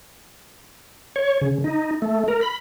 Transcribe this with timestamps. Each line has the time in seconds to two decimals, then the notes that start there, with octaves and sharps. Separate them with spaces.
1.16 C#5
1.41 C#3
1.64 D#4
2.02 A3
2.28 A#4
2.41 B5